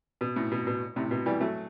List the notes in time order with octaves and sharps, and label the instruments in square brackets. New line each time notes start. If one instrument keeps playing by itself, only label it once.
[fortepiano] B2
A2
B2
B2
A2 C3
B2
E3 G3
F#3 A3